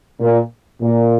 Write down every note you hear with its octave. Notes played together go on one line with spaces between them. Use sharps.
A#2
A#2